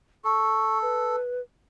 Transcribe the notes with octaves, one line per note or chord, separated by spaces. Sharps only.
A4 C#6
B4